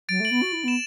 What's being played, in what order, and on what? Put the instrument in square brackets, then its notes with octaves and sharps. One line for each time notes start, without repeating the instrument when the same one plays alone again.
[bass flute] F#3 [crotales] A6 D7
[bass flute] A3
[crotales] D7 F#7
[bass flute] B3
F#4
E4
[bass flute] B3 [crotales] E7